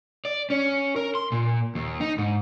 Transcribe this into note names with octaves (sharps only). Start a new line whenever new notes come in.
D5
C#4
A#4
C6
A#2
D#2
D#4
G#2